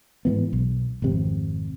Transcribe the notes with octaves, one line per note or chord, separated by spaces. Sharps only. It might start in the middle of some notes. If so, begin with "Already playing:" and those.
G#2 E3 B3
B1
G#1 F2 C3